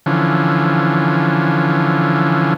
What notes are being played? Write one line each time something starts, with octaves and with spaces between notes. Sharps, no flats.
D3 E3 F3 C#4